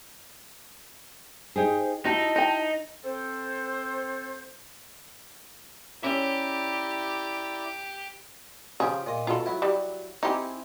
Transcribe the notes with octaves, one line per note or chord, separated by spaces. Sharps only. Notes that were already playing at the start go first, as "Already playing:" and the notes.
D#4 G4 G#4 C5
D#4 E4 F#4 G4 A5
D#4 D#5 G5
C4 A4 C5
C#4 E4 G4 D5 E5 A#5
C#3 F3 G4 G#4
A#2 D#5
B2 F4 A4
F#3 E4
G3
C4 D#4 E4 G4 G#4